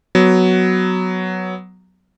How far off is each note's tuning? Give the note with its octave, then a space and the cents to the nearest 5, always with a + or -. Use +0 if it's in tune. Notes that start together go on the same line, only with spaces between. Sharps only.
F#3 +5 B3 +0